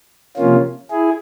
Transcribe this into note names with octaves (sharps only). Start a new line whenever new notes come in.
C3 F3 A#3 C#4 F4
E4 G#4